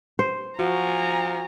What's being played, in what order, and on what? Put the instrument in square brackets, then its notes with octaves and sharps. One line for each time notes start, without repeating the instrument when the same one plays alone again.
[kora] C5
[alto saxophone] F3 [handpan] F#4 [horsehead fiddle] G#5 A#5